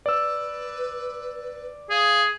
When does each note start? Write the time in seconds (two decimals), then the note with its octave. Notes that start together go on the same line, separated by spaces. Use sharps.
0.06 B4 D5 E6
1.90 G#4 F5